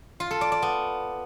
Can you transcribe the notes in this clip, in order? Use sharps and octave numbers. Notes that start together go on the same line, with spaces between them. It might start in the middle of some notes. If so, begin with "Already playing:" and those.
F4
A4
D5
D5
B3